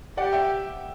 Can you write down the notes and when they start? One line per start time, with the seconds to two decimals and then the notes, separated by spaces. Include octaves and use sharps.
0.17 G4 D5 F#5
0.32 E5 G5